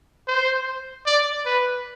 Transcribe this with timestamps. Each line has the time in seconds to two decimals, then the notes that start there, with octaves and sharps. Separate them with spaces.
0.28 C5
1.06 D5
1.46 B4